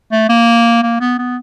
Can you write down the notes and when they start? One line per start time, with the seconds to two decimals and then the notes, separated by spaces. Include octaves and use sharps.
0.12 A3
0.29 A#3
0.83 A#3
1.00 B3
1.18 B3